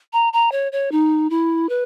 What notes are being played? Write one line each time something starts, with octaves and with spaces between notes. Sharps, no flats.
A#5
A#5
C#5
C#5
D#4
E4
B4